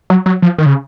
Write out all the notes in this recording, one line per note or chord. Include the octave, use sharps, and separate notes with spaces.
F#3
F#3
F3
D#3
C#3